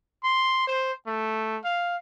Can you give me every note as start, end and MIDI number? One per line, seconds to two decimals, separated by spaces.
0.24 0.66 84
0.67 0.92 72
1.07 1.59 57
1.64 1.97 77